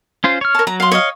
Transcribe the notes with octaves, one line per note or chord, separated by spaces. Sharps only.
C#4 F4 C5
C#5 F6
A#4 A5
F#3 A#5
F5 C6
C#5 D#5 F5